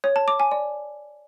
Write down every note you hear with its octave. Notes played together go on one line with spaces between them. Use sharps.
C#5
A5
D6
G#5
D5